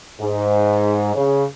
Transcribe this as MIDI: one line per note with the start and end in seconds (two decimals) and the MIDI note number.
0.20 1.13 44
1.15 1.44 49